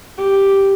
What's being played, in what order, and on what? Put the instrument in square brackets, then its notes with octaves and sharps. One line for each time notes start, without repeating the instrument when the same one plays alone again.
[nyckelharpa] G4